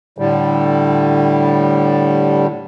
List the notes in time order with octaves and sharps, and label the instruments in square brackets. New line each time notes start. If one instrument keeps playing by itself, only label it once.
[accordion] A2 D3 G3